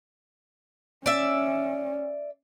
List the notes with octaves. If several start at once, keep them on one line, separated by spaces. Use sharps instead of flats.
C#4 D5 E5